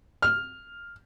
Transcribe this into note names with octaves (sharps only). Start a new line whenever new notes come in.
F6